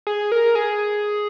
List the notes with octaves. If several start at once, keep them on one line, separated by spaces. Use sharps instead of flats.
G#4
A#4
G#4